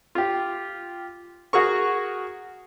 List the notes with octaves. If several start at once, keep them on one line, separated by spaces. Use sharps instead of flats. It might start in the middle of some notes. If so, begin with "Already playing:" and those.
F4 G4
F#4 G#4 A#4 C#6